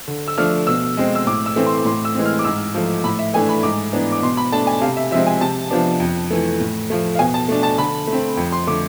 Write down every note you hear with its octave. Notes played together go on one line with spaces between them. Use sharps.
D3
E6
F3 A3 D4 F6
B2 E6
G#3 C4
E6
A2 D6
E6
E3 A3 C4
C6
A2 C6
E6
E3 G#3 C4
F6
D6
G#2 E6
F3 A3
A2 B5
E5
E3 A3 D4 G#5
B5
G#2 D6
E3 B3 D4
D6
B2 C6
B5
A3 D4 A5
G#5
C3 F5
E5
F3 G#3 C4 E5
G#5
C3 A5
F3 B3 D4
F2
E3 A3
A2
F3 A3
F5
B2 G#5
A5
A3 D4
A5
D3 B5
A3
C4
F2
C6
D3 A3 D6